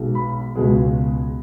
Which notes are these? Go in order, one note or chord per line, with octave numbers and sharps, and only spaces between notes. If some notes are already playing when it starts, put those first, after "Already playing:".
Already playing: B1 B2 G#3
B5
C#2 B2 G#3